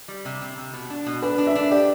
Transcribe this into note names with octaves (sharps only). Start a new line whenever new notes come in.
G3
C3
C3
C3
B2
D4
B2
D4 B4
D4
E5
D4
G4 D5